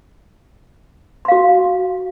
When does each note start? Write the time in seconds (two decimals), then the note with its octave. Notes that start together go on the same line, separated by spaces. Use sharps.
1.25 C6
1.28 F5
1.32 F#4